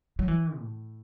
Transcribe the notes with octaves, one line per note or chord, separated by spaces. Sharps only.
F#3
E3
A2